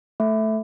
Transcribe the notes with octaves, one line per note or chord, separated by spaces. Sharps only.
A3